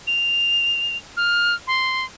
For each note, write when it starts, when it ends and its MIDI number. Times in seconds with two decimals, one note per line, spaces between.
0.07 0.97 101
1.17 1.55 89
1.67 2.05 84